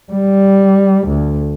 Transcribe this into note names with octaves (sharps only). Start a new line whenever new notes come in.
G3
D2